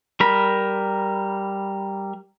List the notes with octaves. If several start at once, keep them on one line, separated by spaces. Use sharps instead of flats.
G3 A#4 B5